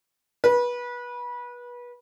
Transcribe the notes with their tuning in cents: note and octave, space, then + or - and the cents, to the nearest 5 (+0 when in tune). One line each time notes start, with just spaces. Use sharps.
B4 -25